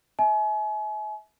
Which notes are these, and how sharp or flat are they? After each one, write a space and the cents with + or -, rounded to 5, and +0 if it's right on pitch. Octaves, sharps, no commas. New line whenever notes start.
E5 -30 G#5 +40